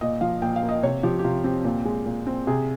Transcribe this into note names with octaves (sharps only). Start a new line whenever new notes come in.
A#2 D#5
F3 F5
A#2 G5
F5
A#3
D#5
C3 C#5
F3 G4
G4
C3 F4
C4 G4
A#2
G#3
A#2
C4
C3 G#4